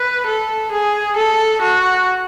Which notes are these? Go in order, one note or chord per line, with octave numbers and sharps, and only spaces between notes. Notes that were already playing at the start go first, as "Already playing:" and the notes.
Already playing: B4
A4
G#4
A4
F#4